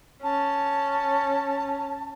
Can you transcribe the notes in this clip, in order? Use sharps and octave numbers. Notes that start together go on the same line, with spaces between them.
C#4 A5